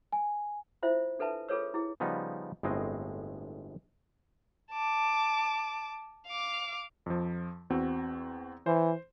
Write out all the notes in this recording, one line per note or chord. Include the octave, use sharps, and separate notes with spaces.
G#5
E4 F4 C5 E5
D4 A4 B4 E5 A5
F4 G#4 A4 B4 C#5 E6
E4 G#4
C#3 F3 G3 B3 D#4
G1 A2 G#3 C4 D#5
A5 D6
F5 D6
F2 F3
E2 C4 F#4
E3 C5